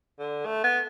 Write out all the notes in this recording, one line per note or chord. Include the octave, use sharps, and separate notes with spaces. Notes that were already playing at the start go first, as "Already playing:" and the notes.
D3
A3
B3